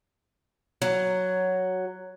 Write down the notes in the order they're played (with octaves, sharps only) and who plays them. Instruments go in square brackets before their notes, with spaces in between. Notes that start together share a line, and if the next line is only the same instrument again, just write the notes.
[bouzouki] F#3